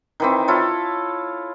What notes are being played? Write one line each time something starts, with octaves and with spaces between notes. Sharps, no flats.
D#3 E3 C4
E4 F4 A4 C#5